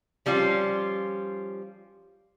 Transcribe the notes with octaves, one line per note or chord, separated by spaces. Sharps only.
F3 G3 C#4 F4